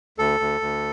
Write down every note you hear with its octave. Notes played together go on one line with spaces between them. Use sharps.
D2 A4
D2
D2